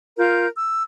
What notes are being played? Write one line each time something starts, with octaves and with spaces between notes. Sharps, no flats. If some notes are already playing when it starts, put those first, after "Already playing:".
F4 A#4 G6
E6